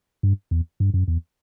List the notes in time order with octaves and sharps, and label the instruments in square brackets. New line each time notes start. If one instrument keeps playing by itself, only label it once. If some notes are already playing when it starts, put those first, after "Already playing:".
[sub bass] G2
E2
G2
F#2
E2